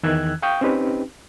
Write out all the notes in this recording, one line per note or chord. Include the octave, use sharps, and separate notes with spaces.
E2 D#3 E3 E6 F#6 G#6
F5 G5 C#6 D#6 G6
C4 C#4 D#4 G4 B4